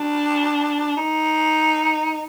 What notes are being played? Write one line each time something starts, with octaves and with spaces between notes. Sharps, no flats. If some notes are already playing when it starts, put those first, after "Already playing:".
Already playing: D4
D#4